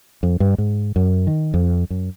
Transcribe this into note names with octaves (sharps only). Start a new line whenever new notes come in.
F2
G2
G#2
F#2
D#3
F2
F#2